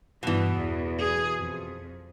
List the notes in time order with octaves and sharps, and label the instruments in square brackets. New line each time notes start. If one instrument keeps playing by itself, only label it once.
[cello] G2 B3 [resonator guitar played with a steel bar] B2 E3
[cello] E2
G#4
F2